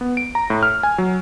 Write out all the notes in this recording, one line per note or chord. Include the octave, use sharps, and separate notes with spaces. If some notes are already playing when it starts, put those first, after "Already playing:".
B3
D7
A#5
A2
F6
G#5
F#3